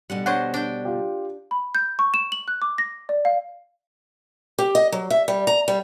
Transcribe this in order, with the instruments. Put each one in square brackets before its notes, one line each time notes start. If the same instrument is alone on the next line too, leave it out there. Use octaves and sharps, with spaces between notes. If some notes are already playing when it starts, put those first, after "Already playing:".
[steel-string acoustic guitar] B2 D3 G3 [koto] F#5
[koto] D4 C5 D#5 [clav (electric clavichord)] C#5 F#5
[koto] D4 G5
[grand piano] F4 G4
[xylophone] B5
G6
C#6
E7
F#7
F#6
D6
A#6
D5
F5
[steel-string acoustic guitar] G4
D#5
F#3
E5
G3
A#5
G3